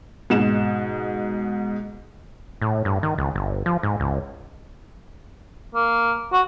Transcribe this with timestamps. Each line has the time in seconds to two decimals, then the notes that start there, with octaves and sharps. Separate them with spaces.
0.30 G#2 B2 E7
2.62 A2
2.85 G2
3.03 D#3
3.18 C#2
3.36 G1
3.66 F3
3.83 G#2
4.00 C#2
5.75 A#3
6.33 F#4